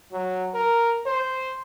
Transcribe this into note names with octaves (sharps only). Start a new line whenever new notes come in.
F#3
A#4
C5